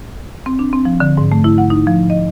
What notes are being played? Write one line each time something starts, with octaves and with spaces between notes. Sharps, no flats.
C4
D4
C4
F3
D3
G#2
A3
E4
F#5
D#4
F3
D#5